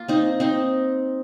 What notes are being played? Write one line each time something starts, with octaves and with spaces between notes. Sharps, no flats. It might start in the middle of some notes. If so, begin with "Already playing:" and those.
Already playing: A#3 F4
C4 D#4
C4 D#4